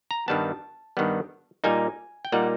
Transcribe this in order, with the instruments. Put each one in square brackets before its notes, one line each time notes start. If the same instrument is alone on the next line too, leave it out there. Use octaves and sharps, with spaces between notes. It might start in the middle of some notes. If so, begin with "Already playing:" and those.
[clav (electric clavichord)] A#5
G2 D#3 G3 B3 A5
G2 D#3 G3 B3
A#2 G3 A#3 D#4 G#5
G5
A#2 G3 A#3 D#4 F#5